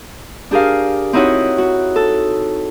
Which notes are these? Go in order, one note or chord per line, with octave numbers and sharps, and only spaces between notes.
D4 G4 G#4 A#4 F5
C4 D#4 E4 F#4 C#5 F#5
F#4
A4